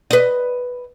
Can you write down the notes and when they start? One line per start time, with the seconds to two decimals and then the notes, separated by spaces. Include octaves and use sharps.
0.11 B4 D#5